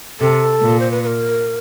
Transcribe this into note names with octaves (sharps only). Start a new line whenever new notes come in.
C3 A4
A#2
C5
B4
B4
A#4